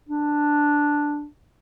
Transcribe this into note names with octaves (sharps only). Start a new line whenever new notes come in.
D4